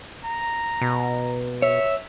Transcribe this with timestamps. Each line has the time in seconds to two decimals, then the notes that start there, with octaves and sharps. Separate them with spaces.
0.24 A#5
0.82 B2
1.62 C#5 E5